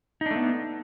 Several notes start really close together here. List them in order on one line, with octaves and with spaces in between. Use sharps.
D#4 D4 A3 B3